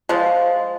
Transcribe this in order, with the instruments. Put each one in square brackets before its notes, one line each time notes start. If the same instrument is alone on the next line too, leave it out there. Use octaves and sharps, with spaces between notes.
[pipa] F3 G#3